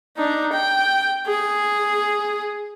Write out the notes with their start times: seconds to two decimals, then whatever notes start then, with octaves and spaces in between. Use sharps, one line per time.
0.17 D4 D#4
0.52 G5
1.27 G#4